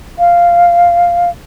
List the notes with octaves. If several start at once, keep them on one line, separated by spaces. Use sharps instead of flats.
F5